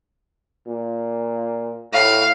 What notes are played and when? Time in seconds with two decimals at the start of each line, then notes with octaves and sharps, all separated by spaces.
0.67 A#2
1.93 A2 F5